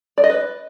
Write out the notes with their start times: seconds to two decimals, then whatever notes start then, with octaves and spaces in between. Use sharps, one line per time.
0.18 D5
0.24 D#5
0.30 B4